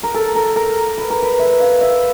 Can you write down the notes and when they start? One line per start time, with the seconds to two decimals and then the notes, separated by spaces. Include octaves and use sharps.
0.03 A#4
0.14 A4
0.35 A#4
0.56 A#4
0.98 B4
1.10 A#4
1.22 B4
1.39 E5
1.60 F5
1.81 E5